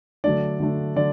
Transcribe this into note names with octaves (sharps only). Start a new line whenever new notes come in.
D3 F#3 A3 D4 D5
D3 F#3 A3 D4
D3 F#3 D5